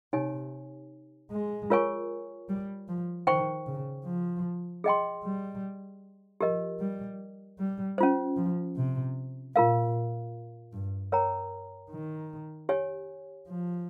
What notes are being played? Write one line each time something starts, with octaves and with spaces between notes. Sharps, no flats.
C3 D#4 G4 C#5 G#5
G#3
F4 A#4 C#5 G#5 C#6
G3
F3
D#3 C5 G5 C#6
C#3
F3
G#4 D#5 G5 C6
G3
F3 G4 A#4 D#5
G3
G3
C#4 F4 C5
F3
C3
A#2 F4 A#4 F5
G2
A#4 C#5 G5 A#5
D#3
G4 C#5 G#5
F3